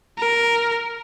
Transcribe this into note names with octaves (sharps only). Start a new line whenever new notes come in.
A#4